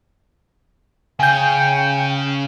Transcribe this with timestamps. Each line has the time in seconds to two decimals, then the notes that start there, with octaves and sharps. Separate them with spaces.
1.20 C#3 G5 G#5 G6